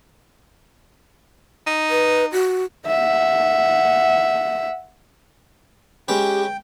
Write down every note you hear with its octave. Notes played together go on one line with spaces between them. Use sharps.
D#4
B4
F#4
E5 F#5
G#3 C#4 G4 B4 G5